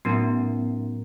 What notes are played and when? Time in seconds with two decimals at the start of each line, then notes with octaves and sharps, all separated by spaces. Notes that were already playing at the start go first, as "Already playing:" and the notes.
0.05 A2 F#3 B3 C#4 D#4 A#4